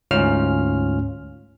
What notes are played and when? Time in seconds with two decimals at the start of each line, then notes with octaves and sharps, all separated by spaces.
0.11 D2 G#2 C#4 F4 F6